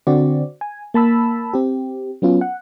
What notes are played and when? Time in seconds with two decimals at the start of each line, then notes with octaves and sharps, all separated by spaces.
0.07 D3 C4 F#4 D5
0.61 G#5
0.94 A#3 A5 B5 E6
1.53 C4 G4
2.22 F#3 B3 C#4 F4
2.41 F#5